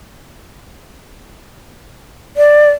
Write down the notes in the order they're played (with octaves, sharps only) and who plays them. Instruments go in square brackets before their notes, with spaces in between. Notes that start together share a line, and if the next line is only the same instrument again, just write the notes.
[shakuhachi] D5